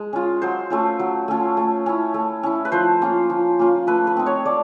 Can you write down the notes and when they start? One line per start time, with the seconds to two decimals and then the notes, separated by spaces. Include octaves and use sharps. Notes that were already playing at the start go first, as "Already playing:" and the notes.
Already playing: G#3
0.13 C#4 F4
0.42 F#3 C5
0.70 A3 C#4 F4
0.99 F#3
1.28 A3 C#4 F4
1.57 A3
1.86 C#4 E4
2.14 A3
2.43 C#4 E4
2.65 B4
2.72 F3 C5
3.02 A#3 C#4 F4
3.30 F3
3.59 A#3 C#4 F4
3.87 A3 B4
4.07 B4
4.17 C4 D#4
4.26 C#5
4.45 A3 D5